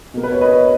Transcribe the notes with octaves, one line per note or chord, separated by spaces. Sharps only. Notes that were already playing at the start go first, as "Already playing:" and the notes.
B2 A#3
B4
C#5
B4 D#5
C#5